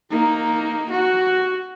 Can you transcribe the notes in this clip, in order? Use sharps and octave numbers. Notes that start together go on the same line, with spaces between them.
A#3 D#4
F#4